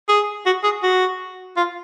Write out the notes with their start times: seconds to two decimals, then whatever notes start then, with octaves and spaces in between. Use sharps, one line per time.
0.09 G#4
0.46 F#4
0.64 G#4
0.83 F#4
1.57 F4